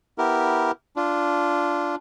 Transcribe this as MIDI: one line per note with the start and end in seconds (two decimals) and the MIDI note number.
0.18 0.71 59
0.18 0.71 64
0.18 0.71 67
0.18 0.71 70
0.96 1.95 62
0.96 1.95 65